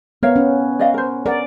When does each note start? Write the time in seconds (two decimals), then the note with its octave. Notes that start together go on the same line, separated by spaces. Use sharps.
0.23 B3 A#4 C#5 F5
0.36 C#4
0.79 D5 D#5 F5
0.94 A#4 C5
1.26 A#4 D5 F#5